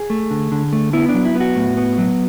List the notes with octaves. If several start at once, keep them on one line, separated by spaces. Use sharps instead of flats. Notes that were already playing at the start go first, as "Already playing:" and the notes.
Already playing: G#4
A3
D3
D3
A3
B3 E4
D4
F#3
E4
B3 F#4
A2
B3
F#3